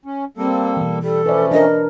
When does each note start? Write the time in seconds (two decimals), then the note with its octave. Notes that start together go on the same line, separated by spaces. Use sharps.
0.05 C#4
0.37 G3 A#3 C4 A4
0.77 B2 E3
1.02 G3 A4
1.26 F3 A3 C#4 B4 D5
1.51 D4 A#4 D#5